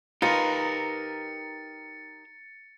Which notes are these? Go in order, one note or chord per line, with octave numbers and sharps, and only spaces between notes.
D#4 F4 G4 A#4 B4 A6 C#7